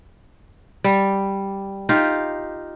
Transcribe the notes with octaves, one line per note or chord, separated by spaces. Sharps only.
G3
D#4 F4 G4 F5